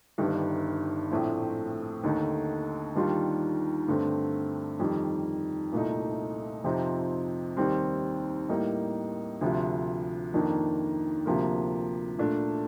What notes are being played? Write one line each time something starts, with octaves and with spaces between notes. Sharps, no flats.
G1 G2 D#3 G3
A#1 A2 A3 C4
D#2 D3 A3 D#4
D#2 D#3 G3 D4 F4
G2 D3 A3 C4
F2 D#3 G3
C2 A#2 A3 D#4
F2 C3 F3 C4 D#4
D#2 D#3 G3 C4
A2 G3 A#3 D#4
D2 C3 F3
F2 D#3 A#3 D4
D2 C3 F3 A#3
A#2 A3 D4